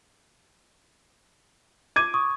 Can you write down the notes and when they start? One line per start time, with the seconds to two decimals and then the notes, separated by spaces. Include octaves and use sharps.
1.96 D6 G#6 D#7
2.14 C#6 D#6